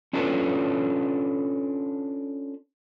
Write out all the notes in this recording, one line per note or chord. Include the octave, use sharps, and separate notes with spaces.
C#4 D4 F4 A4 B4 C#5